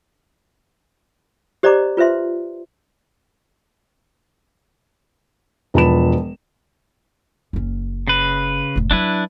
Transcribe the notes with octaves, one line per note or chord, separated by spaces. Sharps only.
G4 C5 D5 D#5 A#5 D6
F4 B4 C5 E5 C6
E1 F3 B4 A5 B5 E7
F#1 C#4
C#3 B4
F1 A2
F#3 D4 E4 B4